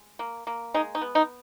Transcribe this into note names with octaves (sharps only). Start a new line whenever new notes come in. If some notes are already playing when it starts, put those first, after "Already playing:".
Already playing: G#3
A#3
A#3
G#3 D#4
D#4
B3
D#4